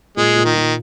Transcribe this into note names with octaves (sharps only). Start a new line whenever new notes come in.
A#2 G#3
A#2
D#3
A#2